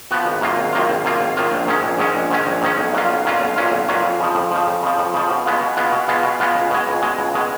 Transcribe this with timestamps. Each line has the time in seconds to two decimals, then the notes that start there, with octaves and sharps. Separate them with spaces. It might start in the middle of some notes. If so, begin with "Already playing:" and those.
0.11 F3 B3 F#4
0.25 G#1
0.41 F#2 D#3 A#3 F4
0.57 G#1
0.73 F#2 D#3 A#3 F4
0.90 G#1
1.05 F#2 D#3 A#3 F4
1.21 G#1
1.37 F#2 D#3 A#3 F4
1.52 A#1
1.67 G#2 D#3 G#3 C#4
1.83 A#1
1.98 G#2 D#3 G#3 C#4
2.15 A#1
2.30 G#2 D#3 G#3 C#4
2.47 A#1
2.62 G#2 D#3 G#3 C#4
2.78 B1
2.94 A#2 F#3 C#4 F4
3.09 B1
3.25 A#2 F#3 C#4 F4
3.41 B1
3.56 A#2 F#3 C#4 F4
3.72 B1
3.88 A#2 F#3 C#4 F4
4.03 F2
4.20 C#3 F3
4.35 F2
4.51 C#3 F3
4.67 F2
4.82 C#3 F3
4.98 F2
5.14 C#3 F3
5.29 B2
5.46 G#3 B3 F4
5.61 B2
5.77 G#3 B3 F4
5.92 B2
6.08 G#3 B3 F4
6.23 B2
6.40 G#3 B3 F4
6.55 C#2
6.70 B2 G#3
6.87 C#2
7.02 B2 G#3
7.18 C#2
7.35 B2 G#3